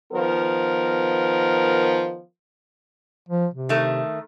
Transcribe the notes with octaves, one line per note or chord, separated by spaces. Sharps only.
D#3 F3 B3 A#4
F3
C3
D#3 A3